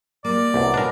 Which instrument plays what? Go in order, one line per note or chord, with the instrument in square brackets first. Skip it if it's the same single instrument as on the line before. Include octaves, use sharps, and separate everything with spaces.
[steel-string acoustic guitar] G3 A#3 [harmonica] D5
[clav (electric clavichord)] C2 [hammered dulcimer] B2 F#3
[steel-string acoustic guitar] A#2 [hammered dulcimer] G#3 D#4 [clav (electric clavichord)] D4 A#4